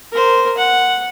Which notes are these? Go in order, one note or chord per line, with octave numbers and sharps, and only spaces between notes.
A#4 C5
F#5